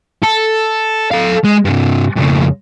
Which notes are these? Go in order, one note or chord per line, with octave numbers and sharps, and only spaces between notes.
A4
A4 F5
G#3
G2 C3
F2 C#3